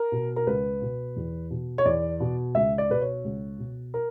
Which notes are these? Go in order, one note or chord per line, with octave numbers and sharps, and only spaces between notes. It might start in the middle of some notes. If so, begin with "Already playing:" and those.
Already playing: A#4
B2
A#4
C#2 B4
B2
E2
B2
C#5
E2 D5
B2
C#2 E5
D5
B2 B4
C#5
C#2
B2
A#4